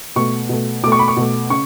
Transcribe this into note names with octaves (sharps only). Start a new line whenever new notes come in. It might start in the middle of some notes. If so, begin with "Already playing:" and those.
B2 A3 C#6
B2 A3
B2 A3 D6
C#6
B5
C#6
B2 A3
C#3 C#6